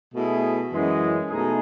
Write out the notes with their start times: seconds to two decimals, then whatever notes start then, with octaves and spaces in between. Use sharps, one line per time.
0.15 B2 A3 E4 G#4
0.73 F#2 E3 G#3
1.30 B2 A3 D#4 G#4